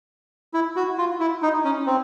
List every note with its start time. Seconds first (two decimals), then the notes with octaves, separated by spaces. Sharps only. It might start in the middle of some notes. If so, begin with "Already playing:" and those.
0.54 E4
0.76 F#4
0.98 F4
1.20 E4
1.42 D#4
1.64 C#4
1.86 C4